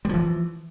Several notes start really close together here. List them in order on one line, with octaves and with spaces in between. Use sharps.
G3 F3 E3